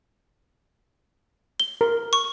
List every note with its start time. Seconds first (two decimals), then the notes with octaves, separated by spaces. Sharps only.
1.60 G7
1.81 A#4
2.13 C#6